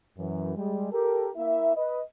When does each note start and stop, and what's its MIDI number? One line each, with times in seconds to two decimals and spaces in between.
0.17 0.55 42
0.17 0.55 52
0.56 0.89 55
0.56 0.89 56
0.92 1.29 67
0.92 1.29 69
0.92 1.29 70
1.36 1.75 58
1.36 1.75 64
1.36 1.75 76
1.76 2.00 71
1.76 2.00 75